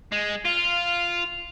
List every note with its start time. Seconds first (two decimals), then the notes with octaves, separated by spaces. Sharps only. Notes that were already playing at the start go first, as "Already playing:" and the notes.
0.12 G#3
0.45 F4